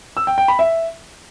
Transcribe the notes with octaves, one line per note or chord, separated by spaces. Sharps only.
E6
G5
G5
B5
E5